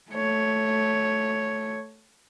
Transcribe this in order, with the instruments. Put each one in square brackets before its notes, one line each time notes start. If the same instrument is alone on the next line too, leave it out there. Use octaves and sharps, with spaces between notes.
[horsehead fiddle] A3 C#5